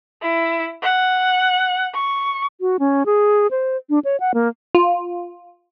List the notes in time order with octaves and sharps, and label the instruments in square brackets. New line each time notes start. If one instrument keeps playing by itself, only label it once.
[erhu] E4
F#5
C#6
[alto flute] F#4
C#4
G#4
C5
D4
C#5
F#5
A#3
[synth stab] F4